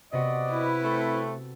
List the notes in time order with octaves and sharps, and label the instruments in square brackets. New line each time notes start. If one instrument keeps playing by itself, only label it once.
[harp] C3 B3 F#4 [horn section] D5 D#5
[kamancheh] E4 B4
[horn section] A3 C4 [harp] A4